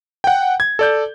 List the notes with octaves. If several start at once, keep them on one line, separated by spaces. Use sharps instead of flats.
F#5 G5
G#6
A4 D5 G6